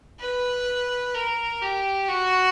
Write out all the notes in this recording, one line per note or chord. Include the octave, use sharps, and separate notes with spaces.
B4
A#4
G4
F#4